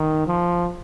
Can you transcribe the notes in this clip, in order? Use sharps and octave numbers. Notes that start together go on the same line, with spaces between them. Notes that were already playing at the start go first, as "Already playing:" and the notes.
Already playing: D#3
F3